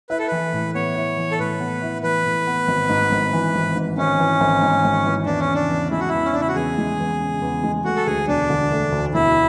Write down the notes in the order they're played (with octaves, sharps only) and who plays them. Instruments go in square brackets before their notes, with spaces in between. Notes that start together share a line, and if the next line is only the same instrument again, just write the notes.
[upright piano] E4 [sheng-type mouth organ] B4
[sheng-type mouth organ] A4
[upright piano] E3 [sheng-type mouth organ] B4
[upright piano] A2
[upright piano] B3 [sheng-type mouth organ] C#5
[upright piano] E4
E3
[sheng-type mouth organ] A4
[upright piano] A2 [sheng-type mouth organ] B4
[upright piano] B3
E4
[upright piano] E3 [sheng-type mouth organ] B4
[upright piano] A2
B3
G#1
G#2
G#1
E3
G#1
G#2
[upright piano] G#1 [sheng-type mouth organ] C#4
[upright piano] E3
G#1
G#2
G#1
E3
[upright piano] E2 [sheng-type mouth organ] D4
[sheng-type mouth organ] C#4
[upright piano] C#3
[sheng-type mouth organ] D4
[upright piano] E2
[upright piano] G#3 [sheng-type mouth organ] E4
[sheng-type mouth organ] F#4
[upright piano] E2 [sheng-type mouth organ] E4
[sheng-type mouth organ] C#4
[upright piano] C#3 [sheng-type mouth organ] D4
[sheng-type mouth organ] E4
F#4
[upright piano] E2 [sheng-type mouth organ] G#4
[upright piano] G#3
E2
C#3
E2
G#3
[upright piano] A3 [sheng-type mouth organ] F#4
[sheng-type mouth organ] A4
[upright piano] D2 [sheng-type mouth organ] G#4
[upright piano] E1 [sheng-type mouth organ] D4
[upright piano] D3
A3
D2
[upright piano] E1 [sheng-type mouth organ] E4